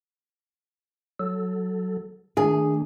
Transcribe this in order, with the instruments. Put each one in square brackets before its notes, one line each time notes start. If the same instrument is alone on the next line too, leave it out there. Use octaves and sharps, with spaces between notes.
[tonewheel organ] F#3 A4
[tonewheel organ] D#3 A3 D4 [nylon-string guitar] G#4